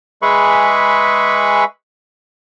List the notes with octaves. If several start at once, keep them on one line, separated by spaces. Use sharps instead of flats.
G#3 G#4 B4 E5 B5 C#6